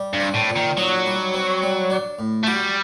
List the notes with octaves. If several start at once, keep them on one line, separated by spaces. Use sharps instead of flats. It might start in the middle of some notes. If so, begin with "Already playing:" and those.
Already playing: G3
G2
C4
A2
A#2
D#3
F#3 D#4
G3
C4
G3
D4
A2
A3
G3 F#4